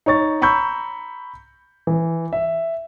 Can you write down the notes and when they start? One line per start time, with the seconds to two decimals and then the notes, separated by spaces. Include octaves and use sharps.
0.06 D#4 C#5 C#6 A6
0.42 A#5 B5 C#6 E6 G6
1.87 E3
2.33 E5